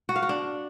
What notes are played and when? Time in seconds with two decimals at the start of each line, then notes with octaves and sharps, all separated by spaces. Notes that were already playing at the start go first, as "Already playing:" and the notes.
0.09 F#4
0.16 F5
0.22 F#4
0.29 D4